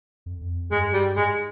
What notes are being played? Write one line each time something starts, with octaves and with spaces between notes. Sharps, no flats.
F2
F2
G2 G#3
G3
G#2 G#3